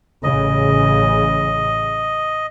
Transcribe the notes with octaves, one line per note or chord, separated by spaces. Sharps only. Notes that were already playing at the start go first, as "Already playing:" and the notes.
A1 C#3 D#5